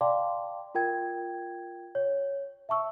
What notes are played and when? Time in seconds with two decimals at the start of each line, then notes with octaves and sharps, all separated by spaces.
0.01 D5 F5 G5 A5 C6 D6
0.75 F4 A#4 G5 G#6
1.95 C#5
2.69 E5 A5 C#6 E6